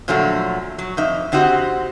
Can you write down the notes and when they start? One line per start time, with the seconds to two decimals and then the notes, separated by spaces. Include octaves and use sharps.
0.08 A#2 D3 F3 F#3 A3
0.79 F#3
0.97 F2 D#4 E5
1.32 D3 C4 D#4 F#4 G4